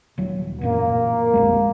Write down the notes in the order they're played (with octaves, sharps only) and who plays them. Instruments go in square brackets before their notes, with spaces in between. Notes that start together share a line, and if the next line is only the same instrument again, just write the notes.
[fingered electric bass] D#1 F#3
[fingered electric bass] A1 F#2 A#2 [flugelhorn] A#3
[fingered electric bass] B1 F2 G#3